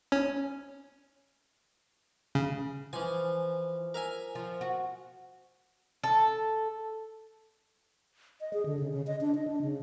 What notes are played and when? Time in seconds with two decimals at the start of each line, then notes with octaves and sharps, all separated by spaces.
0.12 C#4
2.35 C#3
2.93 E3 F3 G#5
3.94 A#4 E5 G#5
4.35 F3
4.61 F#4
6.03 A4
8.41 D#5
8.53 G#4
8.66 D3
8.79 C#3
8.92 C#3
9.07 D#5
9.21 D4
9.35 D#5
9.48 D4
9.62 C#3